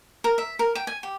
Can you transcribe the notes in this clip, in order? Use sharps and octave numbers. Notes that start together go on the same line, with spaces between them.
A#4
E5
A#4
G5
G#5
G4